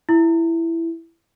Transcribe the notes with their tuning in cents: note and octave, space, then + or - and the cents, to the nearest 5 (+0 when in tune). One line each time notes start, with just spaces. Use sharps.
E4 +10